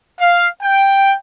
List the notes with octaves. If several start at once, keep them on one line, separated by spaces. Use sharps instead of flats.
F5
G5